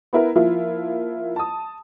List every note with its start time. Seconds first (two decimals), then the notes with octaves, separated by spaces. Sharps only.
0.13 B3 E4 A#4
0.36 F3 A#3 E4 F4
1.36 A5 D#6